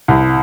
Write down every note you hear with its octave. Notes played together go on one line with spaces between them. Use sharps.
C2